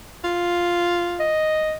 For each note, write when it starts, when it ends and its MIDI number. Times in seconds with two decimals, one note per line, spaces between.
0.24 1.31 65
1.20 1.75 75